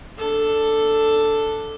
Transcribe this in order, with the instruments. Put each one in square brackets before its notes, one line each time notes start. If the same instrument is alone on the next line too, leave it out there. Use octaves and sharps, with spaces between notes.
[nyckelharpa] D4 A4